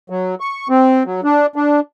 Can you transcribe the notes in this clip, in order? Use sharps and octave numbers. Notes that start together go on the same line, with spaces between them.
F#3
C#6
C4
F#3
D4
D4